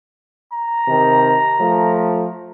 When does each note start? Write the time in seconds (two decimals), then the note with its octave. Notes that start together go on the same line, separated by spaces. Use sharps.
0.52 A#5
0.87 C3 D#3
1.60 F3 A3